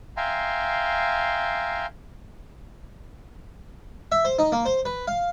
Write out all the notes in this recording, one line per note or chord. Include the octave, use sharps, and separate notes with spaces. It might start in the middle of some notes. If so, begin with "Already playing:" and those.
E5 F5 G5 G#5 A#5 C6
E5
C5
D#4
A#3
C5
B4
F5